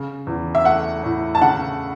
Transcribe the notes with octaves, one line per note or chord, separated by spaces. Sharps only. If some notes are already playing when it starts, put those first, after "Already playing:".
Already playing: C#3
E2
E5
A3 F#5
A2
A5
C#3 F#5